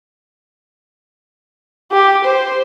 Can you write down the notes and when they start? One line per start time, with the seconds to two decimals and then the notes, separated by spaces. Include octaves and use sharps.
1.92 G4
2.24 C5